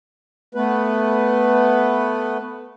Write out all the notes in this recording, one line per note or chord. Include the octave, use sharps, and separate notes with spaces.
A3 B3 B4